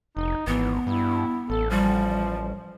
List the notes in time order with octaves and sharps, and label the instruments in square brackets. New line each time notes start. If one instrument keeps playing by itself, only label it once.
[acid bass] F1 [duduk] D#4
[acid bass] G#1 [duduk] E3 [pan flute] B3
[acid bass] G2 [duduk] E4
[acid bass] A1 [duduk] A4
[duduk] F3 [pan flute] G3